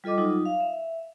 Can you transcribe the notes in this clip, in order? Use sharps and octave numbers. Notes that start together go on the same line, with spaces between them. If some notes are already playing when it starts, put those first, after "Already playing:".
G3 F4 A4 D#5 D6
F#3 D#4 F4
F5
E5